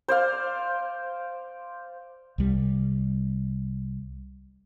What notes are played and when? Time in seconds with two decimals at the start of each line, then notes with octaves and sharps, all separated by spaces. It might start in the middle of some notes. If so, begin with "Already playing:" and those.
0.08 C5 D5 F5
2.38 C2 G3